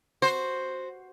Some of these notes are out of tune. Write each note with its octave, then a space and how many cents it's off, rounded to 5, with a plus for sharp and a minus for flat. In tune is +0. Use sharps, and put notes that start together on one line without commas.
F#4 +0 C5 +5